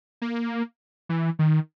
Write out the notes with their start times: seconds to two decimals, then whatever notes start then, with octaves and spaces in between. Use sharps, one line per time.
0.22 A#3
1.09 E3
1.39 D#3